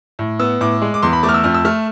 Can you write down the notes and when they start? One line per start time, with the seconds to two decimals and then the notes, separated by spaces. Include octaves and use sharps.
0.19 A2
0.40 B3 E6
0.61 A2 D6
0.82 G#3
0.94 D6
1.02 E2 C6
1.13 B5
1.23 A3 D6
1.29 F6
1.34 E6
1.44 F2 F6
1.54 E6
1.65 A3 F6